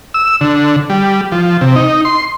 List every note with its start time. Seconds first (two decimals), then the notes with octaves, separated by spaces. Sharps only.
0.14 E6
0.41 D3
0.90 G3
1.32 F3
1.61 C3
1.76 D#4
2.05 C6